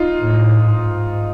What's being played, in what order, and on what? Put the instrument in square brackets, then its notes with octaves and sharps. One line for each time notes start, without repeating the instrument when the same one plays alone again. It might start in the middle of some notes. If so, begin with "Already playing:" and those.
Already playing: [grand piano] D#4 F4
[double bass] A2
G#2